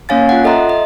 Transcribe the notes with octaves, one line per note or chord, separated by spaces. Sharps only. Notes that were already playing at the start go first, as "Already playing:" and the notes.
A#3 C#4 C#5 F5 G#5 A6
F4 F#5
A4 D#5 E5 A#5 C6
D#5